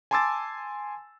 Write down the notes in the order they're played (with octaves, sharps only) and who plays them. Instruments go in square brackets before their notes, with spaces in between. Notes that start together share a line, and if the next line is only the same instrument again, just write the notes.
[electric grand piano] G#5 A5 C6 D6 E6 A6